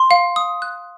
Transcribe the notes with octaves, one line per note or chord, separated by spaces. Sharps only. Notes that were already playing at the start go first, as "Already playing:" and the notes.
Already playing: C6
F5
D#6
F#6